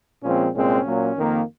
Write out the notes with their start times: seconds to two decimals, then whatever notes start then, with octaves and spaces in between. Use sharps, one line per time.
0.23 A#2 F3 G#3 C4 C#4
0.55 C2 A#2 G#3 C4 C#4
0.86 A#2 F#3 A#3
1.17 F2 D#3 A#3